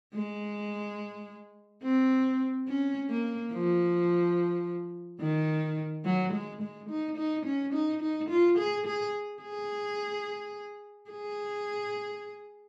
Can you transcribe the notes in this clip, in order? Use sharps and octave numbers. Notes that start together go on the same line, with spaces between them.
G#3
C4
C#4
A#3
F3
D#3
F#3
G#3
G#3
D#4
D#4
C#4
D#4
D#4
F4
G#4
G#4
G#4
G#4